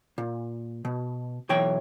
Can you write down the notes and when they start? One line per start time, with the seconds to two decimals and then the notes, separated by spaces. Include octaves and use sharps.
0.18 A#2
0.85 B2
1.49 B1 E3 C#5 G5